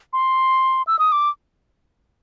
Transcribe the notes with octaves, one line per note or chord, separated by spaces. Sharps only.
C6
E6
D#6
D6